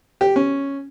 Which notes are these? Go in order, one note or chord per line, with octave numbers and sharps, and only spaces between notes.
G4
C#4